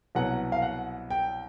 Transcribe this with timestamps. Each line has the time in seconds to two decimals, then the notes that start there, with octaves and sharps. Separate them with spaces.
0.15 C2 B2 F#3 F#5
0.52 F5
0.62 F#5
1.10 G5